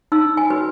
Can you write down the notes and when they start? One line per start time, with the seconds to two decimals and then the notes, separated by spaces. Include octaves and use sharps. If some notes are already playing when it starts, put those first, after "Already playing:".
0.12 D#4 E6
0.37 G#5
0.50 F#4 B4